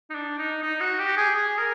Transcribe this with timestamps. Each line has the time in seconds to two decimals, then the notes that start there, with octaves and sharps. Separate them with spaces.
0.10 D#4
0.15 D4
0.39 D#4
0.63 D#4
0.81 F#4
0.99 G4
1.17 G#4
1.35 G#4
1.59 A#4